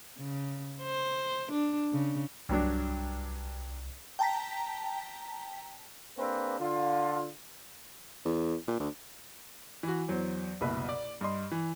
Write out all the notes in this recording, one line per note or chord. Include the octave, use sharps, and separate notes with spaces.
C#3
C5
D4
C#3
C2 G2 F#3 D4
G5 A5 A#5 B6
A#3 C4 D4 G#4 B4
D3 F4
E2
A#2
D2
E3 F#4
E2 F#3 C5
F#1 C2 B2 B4 E5
D5
G2 D#5 C6
E3